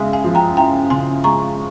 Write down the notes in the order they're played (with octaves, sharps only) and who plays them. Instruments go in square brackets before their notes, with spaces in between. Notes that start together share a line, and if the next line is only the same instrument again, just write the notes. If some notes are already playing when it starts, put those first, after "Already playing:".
Already playing: [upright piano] C#3 G#3 E4
[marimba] F5 G#5
[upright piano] F3
[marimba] G5 A#5
[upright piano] E4 [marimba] G5 A#5
[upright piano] C#3 [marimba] G#5 C6
[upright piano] G#3 [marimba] A#5 C#6